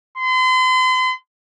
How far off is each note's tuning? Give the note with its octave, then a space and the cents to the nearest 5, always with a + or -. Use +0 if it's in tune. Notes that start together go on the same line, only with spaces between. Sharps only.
C6 -40